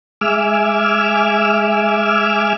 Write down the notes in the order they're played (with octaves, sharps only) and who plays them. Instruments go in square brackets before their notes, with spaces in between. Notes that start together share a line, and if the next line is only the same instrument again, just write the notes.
[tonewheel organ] G#3 E5 G#5 D6 E6 F6